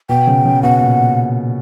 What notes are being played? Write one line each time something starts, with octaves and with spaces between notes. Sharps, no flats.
B2 G5
C#3
C#3
B2 F#5
A#2